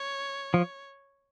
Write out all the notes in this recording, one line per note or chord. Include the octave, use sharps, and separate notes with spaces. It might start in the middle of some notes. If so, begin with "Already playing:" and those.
Already playing: C#5
F3